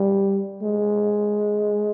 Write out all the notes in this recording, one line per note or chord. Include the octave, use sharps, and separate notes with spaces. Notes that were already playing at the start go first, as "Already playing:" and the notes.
Already playing: G3
G#3